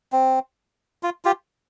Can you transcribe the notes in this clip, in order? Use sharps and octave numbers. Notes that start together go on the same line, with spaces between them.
C4
F4
F4 G4